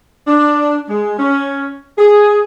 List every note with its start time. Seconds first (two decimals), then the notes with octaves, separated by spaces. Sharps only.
0.26 D4
0.88 G#3
1.18 C#4
1.97 G#4